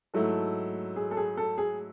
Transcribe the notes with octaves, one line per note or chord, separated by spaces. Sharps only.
G#2 F#3 A3 E4 A4
G#4
A4
G#4
A4
G#4